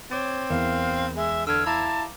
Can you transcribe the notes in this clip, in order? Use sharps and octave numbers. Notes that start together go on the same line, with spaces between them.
C4 C#5 D6 A6
E2 A#4 F5
G#3 E5
D3 E6 F6 G#6
E4 F5 A5 A#5 D6